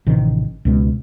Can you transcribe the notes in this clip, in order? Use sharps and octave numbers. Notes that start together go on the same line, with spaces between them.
A1 C3 D#3 F3
C#2 B2 G#3